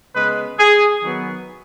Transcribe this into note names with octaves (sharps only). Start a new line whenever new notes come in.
C#3 G#3 B3 B4
G#4
D#3 F#3 B3